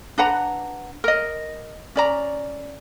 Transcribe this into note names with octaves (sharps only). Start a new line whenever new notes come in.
D4 B4 F#5 A#5
A#4 D#5
C#4 D5 A#5